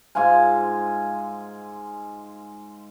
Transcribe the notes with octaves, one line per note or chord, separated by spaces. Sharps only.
G#2 F4 F5 G#5